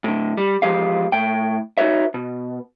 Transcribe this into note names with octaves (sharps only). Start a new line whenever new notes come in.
A2 D3
G3
E2 F3 G#3 G4 F5
A2 G5
D#4 F#4 B4 C#5 E5
B2